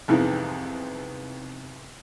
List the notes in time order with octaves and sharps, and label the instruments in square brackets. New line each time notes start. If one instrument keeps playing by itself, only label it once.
[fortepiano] C2 F2 G#2 E3 B3